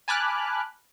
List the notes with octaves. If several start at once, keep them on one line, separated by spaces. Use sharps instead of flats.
G#5 A5 B5 D6 F6 F#6